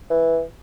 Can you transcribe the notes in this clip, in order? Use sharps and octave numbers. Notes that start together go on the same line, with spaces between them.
E3